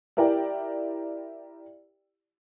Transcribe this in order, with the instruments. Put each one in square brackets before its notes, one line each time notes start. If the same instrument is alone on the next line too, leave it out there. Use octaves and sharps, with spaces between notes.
[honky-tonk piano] E4 G4 A#4 D5 G5